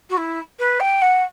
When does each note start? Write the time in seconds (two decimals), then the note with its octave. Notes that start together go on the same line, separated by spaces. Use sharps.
0.09 F#4
0.17 E4
0.59 B4
0.80 G5
1.01 F#5